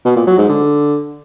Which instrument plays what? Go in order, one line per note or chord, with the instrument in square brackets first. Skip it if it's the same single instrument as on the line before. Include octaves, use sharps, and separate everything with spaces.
[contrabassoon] B2
A#2
F#3
G#2
D3